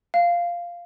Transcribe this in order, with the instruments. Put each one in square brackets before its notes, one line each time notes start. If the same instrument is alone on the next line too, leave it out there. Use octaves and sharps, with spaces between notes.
[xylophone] F5